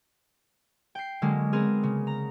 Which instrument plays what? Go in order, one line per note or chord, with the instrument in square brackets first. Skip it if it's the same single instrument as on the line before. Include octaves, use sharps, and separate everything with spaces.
[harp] G5 C7
D3 F#3 G#3 A#3 C#4
B3 C4 G#4 A#4
C#3
A#5